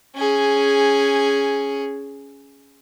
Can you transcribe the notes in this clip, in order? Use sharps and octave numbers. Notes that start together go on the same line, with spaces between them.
C#4 G#4